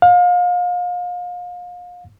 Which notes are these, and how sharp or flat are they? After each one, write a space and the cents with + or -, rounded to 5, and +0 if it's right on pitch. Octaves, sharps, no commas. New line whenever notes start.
F5 +35